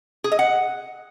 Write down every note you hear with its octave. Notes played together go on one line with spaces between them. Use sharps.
G#4
D#5
F#5